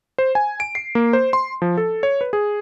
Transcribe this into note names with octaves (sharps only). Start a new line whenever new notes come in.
C5
G#5
D7
C7
A#3
C5
C6
F3
A4
C#5
B4
G#4